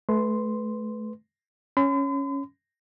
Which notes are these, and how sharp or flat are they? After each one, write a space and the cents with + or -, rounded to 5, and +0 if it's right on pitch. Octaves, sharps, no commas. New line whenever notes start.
A3 -30 B4 +5 C6 +0
C#4 +0 C6 -45